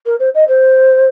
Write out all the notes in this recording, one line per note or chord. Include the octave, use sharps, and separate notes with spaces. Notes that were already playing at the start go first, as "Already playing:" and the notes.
A#4
C5
D#5
C5